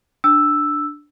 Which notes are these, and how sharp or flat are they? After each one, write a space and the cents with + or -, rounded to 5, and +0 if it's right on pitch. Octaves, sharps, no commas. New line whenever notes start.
D4 +0 E6 +0